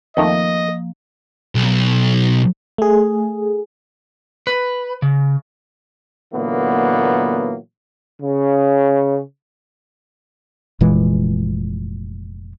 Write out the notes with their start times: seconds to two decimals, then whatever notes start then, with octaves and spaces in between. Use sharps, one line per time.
0.17 F2 D#3 F3 A3 A#3 D#5
1.55 B1
2.78 A3 G#4
4.47 B4
5.02 C#3
6.33 A#2 D3 E3 F#3 A#3 B3
8.21 C#3
10.81 F1 A#2 E3 G#3